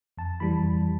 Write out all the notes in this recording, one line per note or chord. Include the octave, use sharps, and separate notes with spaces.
F2 A5
E3 G3 B5
F2